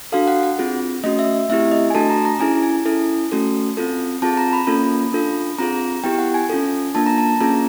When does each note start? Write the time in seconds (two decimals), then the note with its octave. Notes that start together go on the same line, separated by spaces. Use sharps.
0.12 D4 F#4 A4 F5
0.28 F#5
0.43 F#5
0.59 C4 F4 G#4
1.04 A3 C#4 F#4 D#5
1.19 E5
1.49 A3 C4 E4 G4 E5
1.71 D#5
1.90 G#5
1.95 A3 D4 F#4 A4 A5
2.10 A#5
2.25 A#5
2.40 C#4 E4 G#4 G#5
2.63 G#5
2.86 C#4 E4 A4
3.32 A3 C#4 F#4 A4
3.77 C4 F4 A4
4.22 C4 F4 G#4 A5
4.37 A#5
4.53 B5
4.67 A#3 C#4 F4 A4
5.13 D4 F4 A4
5.58 C4 F4 G#4 A#5
6.04 B3 E4 G4 G5
6.19 F#5
6.34 G#5
6.50 C#4 F4 A4
6.95 A#3 D4 F4 A5
7.06 A#5
7.18 A5
7.40 A#3 C#4 F4 G#4 A#5